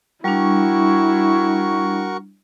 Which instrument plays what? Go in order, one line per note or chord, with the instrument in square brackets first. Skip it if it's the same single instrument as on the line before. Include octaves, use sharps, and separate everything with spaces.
[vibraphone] G3 D4 [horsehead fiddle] E4 [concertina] F#4 A#4 C#6